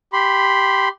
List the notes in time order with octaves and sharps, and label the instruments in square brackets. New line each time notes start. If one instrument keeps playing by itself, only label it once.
[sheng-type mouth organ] G4 B5 C6